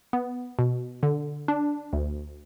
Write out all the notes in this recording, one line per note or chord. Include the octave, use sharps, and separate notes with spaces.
B3
B2
D3
D4
D2